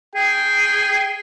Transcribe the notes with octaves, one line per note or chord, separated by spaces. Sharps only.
G#4 G5